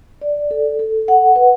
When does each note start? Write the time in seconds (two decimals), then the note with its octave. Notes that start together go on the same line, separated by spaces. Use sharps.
0.21 D5
0.51 A4
0.79 A4
1.08 F#5
1.36 B4